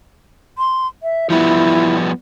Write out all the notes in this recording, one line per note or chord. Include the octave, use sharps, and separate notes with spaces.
C6
E5
F3 G3 B3 E4